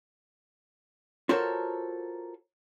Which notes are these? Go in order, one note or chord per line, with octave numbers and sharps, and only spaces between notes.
F4 F#4 A4 A#4 C5 C#5